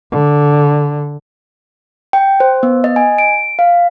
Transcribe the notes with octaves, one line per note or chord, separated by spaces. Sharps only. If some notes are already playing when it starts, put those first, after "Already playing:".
D3
G5
C5
B3
D#5
G#5
D7
F5